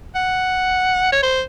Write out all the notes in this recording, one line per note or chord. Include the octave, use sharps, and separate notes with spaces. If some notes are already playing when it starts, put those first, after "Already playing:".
F#5
C#5
C5